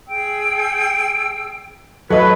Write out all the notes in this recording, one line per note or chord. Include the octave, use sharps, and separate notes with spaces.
G#4 G5 E6
F#3 A4 B4 D#5